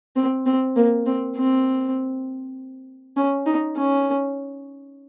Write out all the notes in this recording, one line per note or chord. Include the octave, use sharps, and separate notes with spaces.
C4
C4
A#3
C4
C4
C#4
D#4
C#4